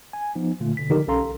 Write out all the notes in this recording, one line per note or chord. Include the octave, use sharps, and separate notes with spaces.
G#5
F3 B3 D#4
A#2 D3 A3 F4
B2 D3 B6
D3 D#3 F3 D#4 G4 A#4
B1 C#4 A4 F5 A#5 C6